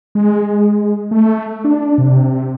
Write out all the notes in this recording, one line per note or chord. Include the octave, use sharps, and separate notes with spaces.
G#3
A3
D4
C3